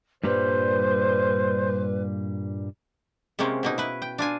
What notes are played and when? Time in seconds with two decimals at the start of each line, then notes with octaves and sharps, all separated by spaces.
0.23 G2 A#2 G3 B4 C5
3.39 C3 G#3 A#3 C4 C#4
3.63 B2 A#3 D#4
3.78 E4 B4
4.02 G5
4.18 D4 F4 G#5